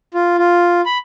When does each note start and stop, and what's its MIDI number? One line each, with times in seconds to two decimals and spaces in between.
0.14 0.37 65
0.38 0.81 65
0.86 0.98 83